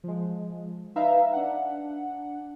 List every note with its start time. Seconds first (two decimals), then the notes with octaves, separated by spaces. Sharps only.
0.04 F3 G#3
0.96 D#4 B4 E5 F5 A#5
1.33 D4 F#5